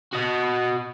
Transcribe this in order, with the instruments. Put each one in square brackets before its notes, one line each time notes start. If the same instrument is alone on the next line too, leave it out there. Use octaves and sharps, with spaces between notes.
[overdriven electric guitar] F#4 D#5